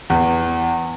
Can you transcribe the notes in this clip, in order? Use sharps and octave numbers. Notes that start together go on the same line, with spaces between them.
E2